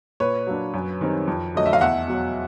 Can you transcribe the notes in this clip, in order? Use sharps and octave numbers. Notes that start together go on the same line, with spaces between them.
A#2 B4 C#5
F#3 A#3 D4
F#2
D#3 G3 C4
F2
D3 F#3 A3 D#5
E5
F5
E2 E5 F#5
B2 F#3